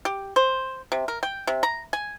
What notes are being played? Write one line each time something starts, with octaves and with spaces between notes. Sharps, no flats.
G4
C5
C3
A#4
G5
C3
A#5
G#5